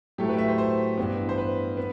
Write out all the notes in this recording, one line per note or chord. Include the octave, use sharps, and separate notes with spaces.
A2 F#3 A3 G4
B4
E5
C5
C5
G2 E3 B3
C5
B4
B3